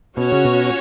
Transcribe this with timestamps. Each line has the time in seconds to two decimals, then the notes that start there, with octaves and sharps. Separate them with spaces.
0.17 B2 C#4 F#4 C#5
0.32 C#3
0.45 B2